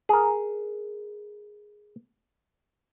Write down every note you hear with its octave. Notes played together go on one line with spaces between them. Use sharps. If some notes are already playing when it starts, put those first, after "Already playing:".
G#4 A#4